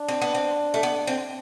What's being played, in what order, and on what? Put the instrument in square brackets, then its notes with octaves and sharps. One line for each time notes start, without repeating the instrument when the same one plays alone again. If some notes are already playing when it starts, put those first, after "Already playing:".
Already playing: [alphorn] D4
[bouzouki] C4
B3
C4
A3
B3
C4